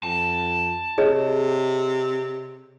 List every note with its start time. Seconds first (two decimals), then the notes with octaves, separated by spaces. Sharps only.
0.03 F2 A5
0.98 C3 G#4 C#5 D#5